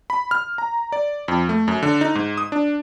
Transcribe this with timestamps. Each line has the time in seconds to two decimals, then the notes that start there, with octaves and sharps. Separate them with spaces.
0.10 B5
0.31 F6
0.58 A#5
0.92 D5
1.28 F2
1.49 A3
1.68 F#2
1.83 D3
2.01 D#4
2.15 G#2
2.38 D#6
2.52 D4